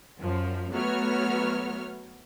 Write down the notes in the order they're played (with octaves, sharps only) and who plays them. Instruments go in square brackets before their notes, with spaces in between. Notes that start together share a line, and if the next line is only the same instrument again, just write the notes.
[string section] F#2 F3
F#3 A3 B3 F#4 C#5 F6